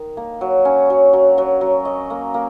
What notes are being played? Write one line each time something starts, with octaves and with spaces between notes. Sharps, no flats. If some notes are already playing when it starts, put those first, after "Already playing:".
Already playing: D#3
A#3
F#3
C#4
F#3
F#3
F#3
F#3
D#5
A#3
A#3